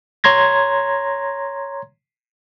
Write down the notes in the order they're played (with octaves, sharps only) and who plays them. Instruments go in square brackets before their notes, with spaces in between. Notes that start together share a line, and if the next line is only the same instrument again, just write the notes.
[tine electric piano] C#5 A#5 C6 G#6 A#6